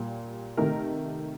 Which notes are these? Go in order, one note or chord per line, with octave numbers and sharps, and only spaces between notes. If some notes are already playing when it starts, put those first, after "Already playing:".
Already playing: A#2 G3
C3 D#3 A3 A#4